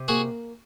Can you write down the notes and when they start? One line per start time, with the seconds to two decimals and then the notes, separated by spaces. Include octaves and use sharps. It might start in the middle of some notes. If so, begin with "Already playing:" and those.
Already playing: C3
0.08 A#3 F#4 G#4